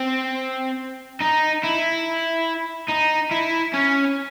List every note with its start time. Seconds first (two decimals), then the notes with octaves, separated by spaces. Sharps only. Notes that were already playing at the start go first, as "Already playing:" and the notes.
Already playing: C4
1.20 D#4
1.64 E4
2.89 D#4
3.31 E4
3.74 C#4